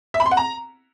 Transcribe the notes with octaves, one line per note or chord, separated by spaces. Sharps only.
E5
B5
C6
F#5
A#5